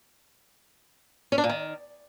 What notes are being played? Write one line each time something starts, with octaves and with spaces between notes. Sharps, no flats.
C#4
D4
A#2
D#3